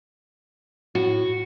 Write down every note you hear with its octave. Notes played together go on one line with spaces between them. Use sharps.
A2 F#4